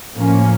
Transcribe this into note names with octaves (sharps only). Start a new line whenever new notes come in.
A2 F3 A#3 C#4